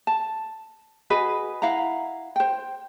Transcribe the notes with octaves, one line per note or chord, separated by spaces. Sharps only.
A5
F#4 G#4 B4 D#5
E4 F5 F#5 A#5
C5 G5